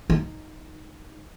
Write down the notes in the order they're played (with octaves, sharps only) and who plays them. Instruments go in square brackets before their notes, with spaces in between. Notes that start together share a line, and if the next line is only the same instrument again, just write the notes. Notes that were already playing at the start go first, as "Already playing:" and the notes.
[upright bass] D#4